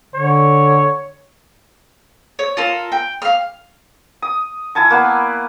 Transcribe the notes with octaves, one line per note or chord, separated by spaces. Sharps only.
D3 C#5
C#5
F4 A4 A#4
G5
F5 F6
D#6
E4 G#5 A5 C#6
A#3 B3 D5